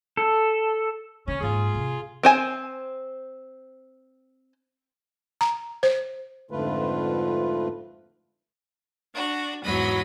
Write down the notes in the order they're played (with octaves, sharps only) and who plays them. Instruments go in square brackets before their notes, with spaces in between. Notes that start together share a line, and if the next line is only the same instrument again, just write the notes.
[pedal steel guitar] A4
[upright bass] C#3 [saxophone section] C#4
[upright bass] D#1 G#2 [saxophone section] F4 G#4
[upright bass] C3
[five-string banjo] C4 C5 G#5
[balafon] A#5
C5
[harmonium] F2 G#2 D3 A3 F4 B4
[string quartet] D4 F#4
E2 G#2 F#3 D#5 B5